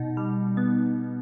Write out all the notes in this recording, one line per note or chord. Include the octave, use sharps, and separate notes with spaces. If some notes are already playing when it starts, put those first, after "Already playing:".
Already playing: B2 D#4
G3
B3